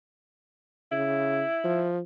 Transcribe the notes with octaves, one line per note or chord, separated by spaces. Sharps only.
C#3 E4
F3